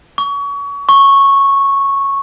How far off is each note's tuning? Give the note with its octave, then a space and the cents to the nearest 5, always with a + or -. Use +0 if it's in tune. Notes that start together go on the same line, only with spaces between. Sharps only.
C#6 +30
C#6 -10